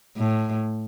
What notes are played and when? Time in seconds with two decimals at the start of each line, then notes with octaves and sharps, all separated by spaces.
0.17 A2